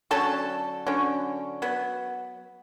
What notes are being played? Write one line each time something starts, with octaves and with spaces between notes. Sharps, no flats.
D3 F#3 C#4 A4 A5
D3 F#3 C#4
F#3 B3